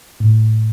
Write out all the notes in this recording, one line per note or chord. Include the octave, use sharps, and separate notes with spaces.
A2